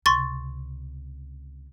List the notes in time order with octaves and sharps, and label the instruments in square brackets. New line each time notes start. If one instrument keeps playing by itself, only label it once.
[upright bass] C#2 C3 [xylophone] C6 C#6 A6